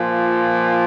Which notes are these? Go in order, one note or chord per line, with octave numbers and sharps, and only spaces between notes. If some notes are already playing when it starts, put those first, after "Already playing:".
Already playing: A#2 F3